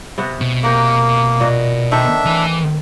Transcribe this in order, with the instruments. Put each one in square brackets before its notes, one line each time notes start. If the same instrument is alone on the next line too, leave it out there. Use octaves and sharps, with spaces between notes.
[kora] C3 B3 F#4
[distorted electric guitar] B2
[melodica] A#3 [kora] G4 A#4 F#5
[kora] A#2 F#4 D#5
[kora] D#3 A3 C4 [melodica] D4 E5
[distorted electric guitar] E3 G#5